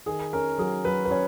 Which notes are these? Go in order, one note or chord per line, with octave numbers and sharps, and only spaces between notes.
D#3 G#4
C#4 A#4
F#3 G#4
F#3 B4
B4
C#4 C#5